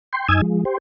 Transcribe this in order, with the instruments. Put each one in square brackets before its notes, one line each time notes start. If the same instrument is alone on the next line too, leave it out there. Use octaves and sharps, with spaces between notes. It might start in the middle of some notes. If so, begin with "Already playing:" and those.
[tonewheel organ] G5 C6
F#2 D#4 G#5 D#6 E6 G#6
F3 G#3
G4 C5